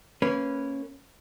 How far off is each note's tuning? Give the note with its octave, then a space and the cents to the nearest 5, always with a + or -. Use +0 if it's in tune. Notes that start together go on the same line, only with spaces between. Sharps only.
A#3 -20 C#4 -10 B4 -5